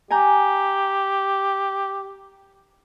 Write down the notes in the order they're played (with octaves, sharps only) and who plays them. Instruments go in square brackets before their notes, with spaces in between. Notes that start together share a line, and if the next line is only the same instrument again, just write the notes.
[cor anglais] G4 [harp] G#5 A#5 G6